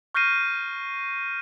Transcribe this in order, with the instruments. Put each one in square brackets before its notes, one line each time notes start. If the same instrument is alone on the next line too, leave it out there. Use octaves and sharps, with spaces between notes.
[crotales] C#6 F6 G6 A#6 C7 D#7